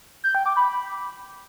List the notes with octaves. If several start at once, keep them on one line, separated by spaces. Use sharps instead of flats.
G6
G5
D6
B5